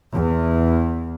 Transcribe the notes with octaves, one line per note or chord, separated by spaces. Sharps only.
E2